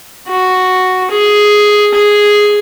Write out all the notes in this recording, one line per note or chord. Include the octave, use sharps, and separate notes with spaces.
F#4
G#4
G#4